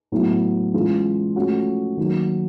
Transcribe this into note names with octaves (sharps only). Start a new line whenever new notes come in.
A2 F#3 B3 E4
E3 G#3 C#4 F4
F3 A3 C#4 F#4
D#3 F#3 A#3